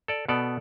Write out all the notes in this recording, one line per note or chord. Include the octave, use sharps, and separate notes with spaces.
A4 D5
B2 B3 A4 D5